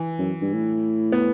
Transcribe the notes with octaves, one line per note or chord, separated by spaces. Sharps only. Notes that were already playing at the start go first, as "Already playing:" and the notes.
Already playing: E3
F#2
G2
A2
B3